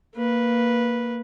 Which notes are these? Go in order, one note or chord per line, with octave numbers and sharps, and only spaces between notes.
A#3 B4